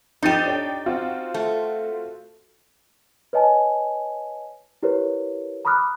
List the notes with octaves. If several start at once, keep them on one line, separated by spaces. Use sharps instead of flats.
F2 D#4 G4 A6 D#7
D4 C#5 G5
C4 F4 F#4
A3
B4 C#5 D#5 G#5 A5
E4 G4 A#4 B4 C#5
A#5 B5 D6 D#6 F6 F#6